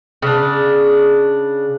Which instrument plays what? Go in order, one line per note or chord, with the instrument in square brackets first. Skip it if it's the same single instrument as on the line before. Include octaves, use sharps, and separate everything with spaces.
[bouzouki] C#3 D4